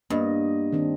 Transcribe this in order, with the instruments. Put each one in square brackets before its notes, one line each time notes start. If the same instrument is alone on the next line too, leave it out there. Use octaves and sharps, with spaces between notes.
[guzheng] G2 [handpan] A#3 B3 D#5
[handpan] D#3 C4 D4